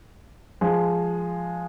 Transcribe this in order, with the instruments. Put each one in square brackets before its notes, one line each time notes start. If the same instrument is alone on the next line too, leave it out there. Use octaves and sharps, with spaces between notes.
[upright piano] F3 G#3